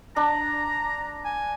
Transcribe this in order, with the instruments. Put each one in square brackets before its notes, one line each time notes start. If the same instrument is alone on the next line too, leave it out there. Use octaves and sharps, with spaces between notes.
[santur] D4 [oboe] A#5
[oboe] G#5